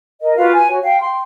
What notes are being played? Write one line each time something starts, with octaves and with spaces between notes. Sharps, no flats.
A#4 D#5
F4 F#4 B4 F5
G#5
F#4 C#5
F5 G5
G5 C6